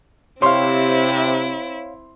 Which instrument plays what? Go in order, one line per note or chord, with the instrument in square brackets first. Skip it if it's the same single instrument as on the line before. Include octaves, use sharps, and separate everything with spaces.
[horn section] C3 [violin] C4 E4 [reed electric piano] C#5 F5 [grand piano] C6